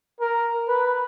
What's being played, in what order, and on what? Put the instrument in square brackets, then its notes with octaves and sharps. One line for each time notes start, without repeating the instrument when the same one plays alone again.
[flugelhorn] A#4
B4